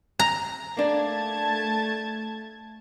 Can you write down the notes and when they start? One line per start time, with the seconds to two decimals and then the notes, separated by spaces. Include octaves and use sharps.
0.19 A#5
0.77 A3 A#3 D4 A5 G#6